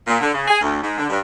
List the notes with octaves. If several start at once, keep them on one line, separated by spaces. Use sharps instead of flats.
A#2
D3
C#3
G#4
D2
G#2
D3
G2